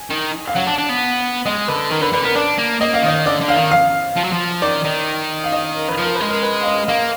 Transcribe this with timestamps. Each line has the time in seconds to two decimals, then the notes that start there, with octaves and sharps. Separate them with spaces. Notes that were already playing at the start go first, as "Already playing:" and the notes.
Already playing: G#5
0.10 D#3
0.48 F5
0.55 F#3 F#5
0.66 D4
0.78 D4
0.89 B3
1.45 G#3 D#5
1.68 D3 B4
1.91 D#3 A#4
2.01 D3 B4
2.13 D3 B4
2.24 B3 A#4
2.36 D4 D5
2.58 A#3
2.81 A#3 D#5
2.94 F5
3.03 D#3 D#5
3.26 D3 D5
3.41 D3
3.48 F5
3.57 D#3
3.71 F5
4.16 F3
4.24 F#3
4.33 F3
4.62 D#3 D5
4.84 D#3
5.44 F5
5.52 D#5
5.75 A#4
5.89 B4
5.97 F3 A#4
6.16 G#3 B4
6.29 A#4
6.43 B4
6.61 F5
6.65 D#5
6.88 A#3 F5